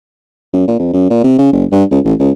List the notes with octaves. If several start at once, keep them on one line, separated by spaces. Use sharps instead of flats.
F#2
A#2
F2
F#2
A#2
C3
C#3
F#1
G2
C#2
A1
C#2